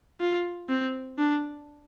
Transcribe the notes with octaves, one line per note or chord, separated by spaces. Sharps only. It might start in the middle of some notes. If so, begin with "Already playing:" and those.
F4
C4
D4